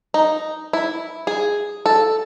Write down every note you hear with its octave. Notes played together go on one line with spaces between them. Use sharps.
D#4
E4
G#4
A4